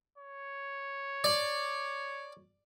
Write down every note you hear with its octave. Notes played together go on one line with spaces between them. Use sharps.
C#5
D5